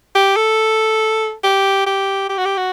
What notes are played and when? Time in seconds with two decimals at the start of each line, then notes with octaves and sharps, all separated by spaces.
0.15 G4
0.36 A4
1.44 G4
1.86 G4
2.29 G4
2.38 F#4
2.45 G4
2.57 F#4